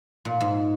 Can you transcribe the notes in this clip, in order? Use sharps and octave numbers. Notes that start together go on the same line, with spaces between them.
A#2
G#2